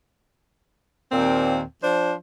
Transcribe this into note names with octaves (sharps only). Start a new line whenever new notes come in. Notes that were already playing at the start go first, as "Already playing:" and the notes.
D#2 A#2 C4
F3 D4 C5